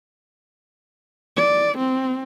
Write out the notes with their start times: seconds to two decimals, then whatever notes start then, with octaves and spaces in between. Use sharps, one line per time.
1.37 D5
1.78 C4